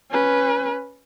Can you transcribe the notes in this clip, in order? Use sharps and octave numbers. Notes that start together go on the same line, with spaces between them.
C#4 B4